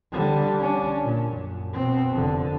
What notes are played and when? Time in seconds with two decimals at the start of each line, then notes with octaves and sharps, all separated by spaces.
0.12 D3 G3
0.59 C#4 D4
1.04 A#2
1.33 F#2
1.74 B2 C4
2.13 F1 D3